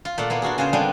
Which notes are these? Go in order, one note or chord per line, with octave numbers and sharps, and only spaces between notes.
F4
A#2 A3 D5 F#5
A#3 B3 E4
D4 F4 F#4 G#4
C#3 F4 G#4 C5
D3 G3 G#3 B3 C4 D4